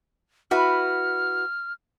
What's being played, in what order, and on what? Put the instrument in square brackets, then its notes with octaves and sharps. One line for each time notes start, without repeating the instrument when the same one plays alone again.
[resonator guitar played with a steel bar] E4 F#4 B4 [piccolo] F6